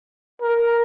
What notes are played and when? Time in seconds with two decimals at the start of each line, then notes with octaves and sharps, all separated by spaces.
0.42 A#4